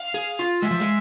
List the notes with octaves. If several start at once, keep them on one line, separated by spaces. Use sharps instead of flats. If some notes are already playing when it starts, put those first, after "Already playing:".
Already playing: F5
G#4
F4
G#3 E5
F3
G#3